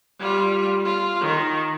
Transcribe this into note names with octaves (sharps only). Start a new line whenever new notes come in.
G3 F4
F4
D#3